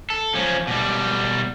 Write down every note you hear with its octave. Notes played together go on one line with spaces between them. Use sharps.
A4
F3 C#4
B2 G3